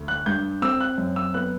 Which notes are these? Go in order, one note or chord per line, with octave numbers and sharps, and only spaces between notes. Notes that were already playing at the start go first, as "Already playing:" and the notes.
Already playing: D2
F#6
G2 G6
C4 E6
F#6
F#2
E6
B3 F#6